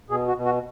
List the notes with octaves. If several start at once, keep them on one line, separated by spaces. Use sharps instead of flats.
B2 G#4
F#4
B2
F#4